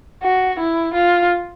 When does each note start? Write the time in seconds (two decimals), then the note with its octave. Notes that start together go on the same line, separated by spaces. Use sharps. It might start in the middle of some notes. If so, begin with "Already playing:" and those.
0.23 F#4
0.60 E4
0.94 F4